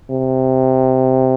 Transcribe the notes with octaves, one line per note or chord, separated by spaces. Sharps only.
C3